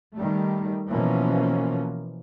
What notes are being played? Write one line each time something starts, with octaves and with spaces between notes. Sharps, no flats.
D#3 G3 A3
B2 E3 F3 A#3 C#4